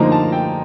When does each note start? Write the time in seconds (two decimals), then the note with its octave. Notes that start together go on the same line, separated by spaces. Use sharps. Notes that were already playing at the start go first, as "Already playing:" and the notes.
Already playing: D3 F3 A#3 D#4 A#5
0.12 A5
0.32 G5